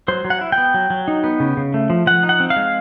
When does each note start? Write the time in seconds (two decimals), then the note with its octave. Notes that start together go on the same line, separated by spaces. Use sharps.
0.08 F#3 C5
0.25 F#3
0.30 F#5
0.41 E4
0.52 G5
0.58 B3
0.74 F#3
0.90 F#3
1.08 D#4
1.24 B3
1.40 C#3
1.57 C#3
1.74 A3
1.90 F3
2.07 F3 F#5
2.23 D#4
2.29 F#5
2.40 C4
2.50 F5
2.56 G#3